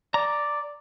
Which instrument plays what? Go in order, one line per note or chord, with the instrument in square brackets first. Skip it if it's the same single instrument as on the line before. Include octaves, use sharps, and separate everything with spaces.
[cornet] D5 [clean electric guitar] A#5